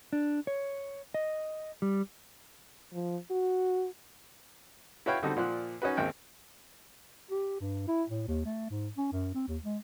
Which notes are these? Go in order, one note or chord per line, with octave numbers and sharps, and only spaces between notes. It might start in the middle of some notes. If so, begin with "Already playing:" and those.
D4
C#5
D#5
G3
F3
F#4
E4 F#4 B4 C#5 F5 G5
D3 G3 C4 D#4 F#4 A4
A#2 F3 D5 F#5 C6 F#6
C#4 D#4 F#4 B4
G#1 D#2 D#3 C4 G5
G4
G2
E4
A2
D#2
A3
G#2
C#4
F#2
C4
D#2
G#3